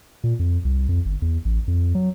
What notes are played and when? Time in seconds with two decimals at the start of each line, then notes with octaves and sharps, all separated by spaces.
0.24 A#2
0.39 F2
0.65 C2
0.89 F2
1.06 G1
1.22 E2
1.45 A1
1.68 F2
1.95 F#3